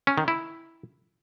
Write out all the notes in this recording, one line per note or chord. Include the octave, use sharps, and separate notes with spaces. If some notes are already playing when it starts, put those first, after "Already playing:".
C#4
D#3
E4